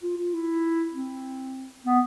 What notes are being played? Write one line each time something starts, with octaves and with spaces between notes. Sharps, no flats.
F4
F4
E4
C4
B3